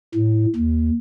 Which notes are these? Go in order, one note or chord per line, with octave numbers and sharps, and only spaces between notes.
A2
D#2